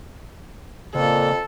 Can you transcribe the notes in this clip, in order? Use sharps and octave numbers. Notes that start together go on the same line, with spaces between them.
F2 A#2 C#3 A#3 A4